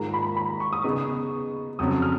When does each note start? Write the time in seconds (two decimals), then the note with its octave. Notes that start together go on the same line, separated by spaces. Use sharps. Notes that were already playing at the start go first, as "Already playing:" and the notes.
Already playing: G#2 D#3 A#3 F4 G#4 A#5
0.14 B5
0.37 B5
0.60 C#6
0.73 D#6
0.84 C#3 G#3 B3 D#4 C#6
1.79 F2 C#3 F#3 C#4 D#6
2.02 F6